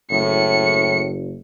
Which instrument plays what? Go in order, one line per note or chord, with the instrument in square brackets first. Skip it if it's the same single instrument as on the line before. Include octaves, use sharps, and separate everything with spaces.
[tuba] F#1 [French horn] A2 [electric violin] C#7